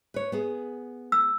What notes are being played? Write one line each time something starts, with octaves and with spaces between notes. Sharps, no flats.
B4 C#5
B3 G#4
E6